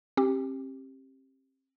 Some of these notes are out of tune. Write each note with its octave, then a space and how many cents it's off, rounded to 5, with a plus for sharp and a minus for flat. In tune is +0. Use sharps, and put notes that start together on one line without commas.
C4 +40 G4 +0